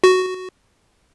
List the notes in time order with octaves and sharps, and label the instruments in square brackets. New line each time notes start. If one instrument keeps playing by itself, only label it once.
[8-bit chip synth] F#4